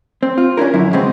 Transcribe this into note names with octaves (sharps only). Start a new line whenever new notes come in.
C4
F4
C#4 D4 E4 A#4
F#2 D3 E4
C#3 F#3 G#3 B3 C4